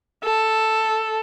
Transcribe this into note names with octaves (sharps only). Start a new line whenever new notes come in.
A4